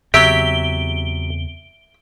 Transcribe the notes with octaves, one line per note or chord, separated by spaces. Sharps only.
E2 C#3 F#3 C4 G4 E5 D7 G7